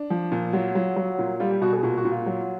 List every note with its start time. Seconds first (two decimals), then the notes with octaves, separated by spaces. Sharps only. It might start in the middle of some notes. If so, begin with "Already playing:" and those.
Already playing: D4
0.10 F3
0.32 A#2
0.53 F#3 F4
0.75 F#3
0.96 F#3
1.19 A#2
1.40 G3 F4
1.51 G4
1.61 B2 F#4
1.73 G#4
1.83 A#2 F#4
1.98 F#4
2.05 A#2
2.12 F4
2.26 F#3